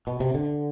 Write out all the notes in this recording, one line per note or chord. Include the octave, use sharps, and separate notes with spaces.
B2
C3
D3